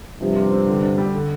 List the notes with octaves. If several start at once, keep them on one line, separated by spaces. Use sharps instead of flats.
G2 C3 F3
F4
C4
D3
D4
G3
D3